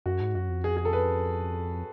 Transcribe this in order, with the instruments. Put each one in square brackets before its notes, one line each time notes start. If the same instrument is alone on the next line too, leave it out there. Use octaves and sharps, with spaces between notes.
[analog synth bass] F#2 [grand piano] F#4
[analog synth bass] G#2
[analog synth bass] F#2 [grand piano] F#4
[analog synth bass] F2
[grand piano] G#4
G#4
A4
B4